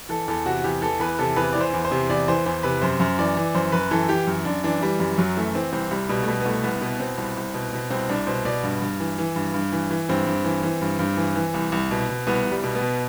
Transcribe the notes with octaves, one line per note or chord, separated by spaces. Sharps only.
E3 A4
E2 A4
C3 F#4
E2 G4
E3 A4
E2 B4
C3 A4
E2 B4
D5
E3
C5
E2
C5
C3
E2 D5
E3 C5
E2 C5
C3 B4
F#2 C5
F#2
E3 D5
E3
F#2 C5
F#2 B4
E3 A4
E3 G4
F#2
F#2 D4
E3 D4
E3 G3
F#2 G3
F#2 F#3
E3 A3
E3 C4
C2 C4
C2 G3
B2 G3
A3
B2 G3
B3
C2 A3
C2 B3
B2 B3
B2 C4
C2
C2
B2
B2
C2 C4
C2 D4
B2 C5
B2 D5
G2
G2
E3
E3
G2
G2
E3
E3
G2 C4
G2
E3
E3
G2
G2
E3
E3
C2
C2
B2
B2
C2 B3
C2
G3
B2
B3
B2